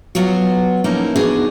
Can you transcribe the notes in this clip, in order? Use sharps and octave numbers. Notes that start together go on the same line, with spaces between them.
F#3 B3 F4 F#4
F3 A#3 C#4 D#4 E4
E3 B3 D4 D#4 F#4 G#4